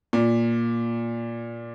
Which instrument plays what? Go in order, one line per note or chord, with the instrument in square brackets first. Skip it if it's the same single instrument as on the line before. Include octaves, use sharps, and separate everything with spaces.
[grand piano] A#2